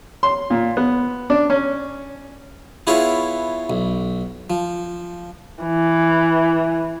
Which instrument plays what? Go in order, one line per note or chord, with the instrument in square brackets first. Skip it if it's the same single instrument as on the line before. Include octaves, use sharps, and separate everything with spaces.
[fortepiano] C6
A#2
B3
D4
C#4
[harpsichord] B3 E4 F4 G#4 C#5 F5
B1
F3
[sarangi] E3